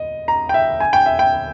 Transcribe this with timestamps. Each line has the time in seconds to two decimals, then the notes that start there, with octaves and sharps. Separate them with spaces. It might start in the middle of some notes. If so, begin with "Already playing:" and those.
Already playing: D#5
0.28 A#5
0.49 G5
0.54 E5
0.80 G#5
0.93 G5
1.06 E5
1.19 G5